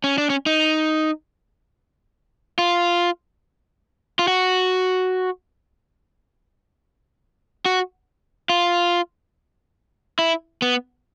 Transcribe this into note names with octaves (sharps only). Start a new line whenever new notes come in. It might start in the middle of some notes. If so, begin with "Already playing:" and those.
C#4
D4
C#4
D#4
F4
F4
F#4
F#4
F4
E4
B3